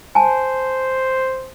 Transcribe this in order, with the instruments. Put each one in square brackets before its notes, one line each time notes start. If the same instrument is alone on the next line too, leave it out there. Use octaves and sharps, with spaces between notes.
[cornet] C5 [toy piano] G#5 A5